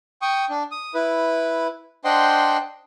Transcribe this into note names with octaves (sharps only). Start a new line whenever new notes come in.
G5 C#6 D#6
D4
D#6
E4 B4
D4 C5 D#5 F#5 G5 C6